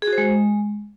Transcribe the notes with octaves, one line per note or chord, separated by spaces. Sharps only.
G#4
F#4
C5
G#3